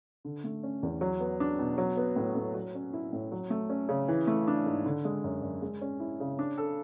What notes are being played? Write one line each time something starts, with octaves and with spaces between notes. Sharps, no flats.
D3
A3
C#4
E2
F#3
B3
D4
B2
F#3
B3
A2
A2
F#3
C#4
E4
A2
F#3
A3
C#4
C#3
E3
A3
D4
G#2
D3
G#3
F#2
F#2
G#3
C#4
E4
C#3
D4
A4